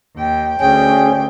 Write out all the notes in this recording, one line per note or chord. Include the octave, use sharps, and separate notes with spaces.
D#2 G5
D2 C#4 G#4 G5